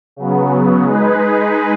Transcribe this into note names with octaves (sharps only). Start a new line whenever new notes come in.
C#3 F#3 B3
G#3 D#4 G#4 B4